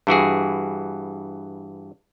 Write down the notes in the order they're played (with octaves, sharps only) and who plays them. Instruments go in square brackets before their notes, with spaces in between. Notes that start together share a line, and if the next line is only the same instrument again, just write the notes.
[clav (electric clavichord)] G2 E3 F#4 G#4